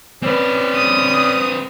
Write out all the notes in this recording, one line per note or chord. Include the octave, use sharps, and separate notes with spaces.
C4 C#4 B4 D5
D#6